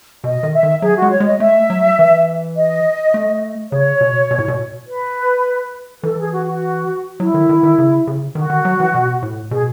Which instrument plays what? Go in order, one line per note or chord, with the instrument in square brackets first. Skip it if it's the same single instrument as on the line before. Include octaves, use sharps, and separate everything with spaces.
[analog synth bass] B2 [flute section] D#5
[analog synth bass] D#3
[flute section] E5
[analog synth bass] D#3
[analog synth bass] F#3 [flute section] G#4
[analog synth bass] G#3 [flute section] F#4
[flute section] C#5
[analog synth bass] G#3
[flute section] D#5
[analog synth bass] A3 [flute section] E5
[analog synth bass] F#3
E3
[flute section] D#5
[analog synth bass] A3
[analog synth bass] C#3 [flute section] C#5
[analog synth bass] B2
B2
A2
B2
[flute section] B4
[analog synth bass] E3 [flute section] A4
[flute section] G#4
F#4
F#4
[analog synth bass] F#3 [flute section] E4
[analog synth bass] D#3
D#3
D#3
C#3
C#3
[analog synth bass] D#3 [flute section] F#4
[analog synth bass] D#3
F#3
E3
B2
A2
[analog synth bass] B2 [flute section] G#4